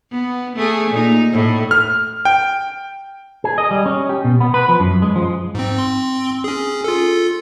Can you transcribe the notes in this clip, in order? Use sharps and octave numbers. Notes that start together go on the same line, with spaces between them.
B3
A3 G#4
A#2 D#4
A2
F6
G5
G#4
D#5
G3
C#4
G4
B2
B3
B4
F3
F#2
G#3
F3
G#2 C4
C4 C6
C#4 G#4
F4 A4